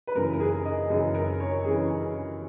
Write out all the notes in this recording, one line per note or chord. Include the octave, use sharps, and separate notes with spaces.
B4
F#2 C#3 E3 A#4
A#4
G#4
D#5
F#2 C#3 E3 G#4
A#4
C#5
C#3 E3 G#4